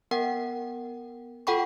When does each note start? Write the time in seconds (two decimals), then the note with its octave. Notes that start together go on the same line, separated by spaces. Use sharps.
0.11 B3 A#4 F#5 G5
1.47 F4 A4 F#5 G5 B5 C#6